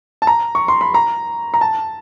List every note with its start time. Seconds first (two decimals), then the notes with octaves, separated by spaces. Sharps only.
0.22 A5
0.27 A#5
0.55 C#6
0.68 C6
0.81 B5
0.94 A#5
1.54 A#5
1.61 A5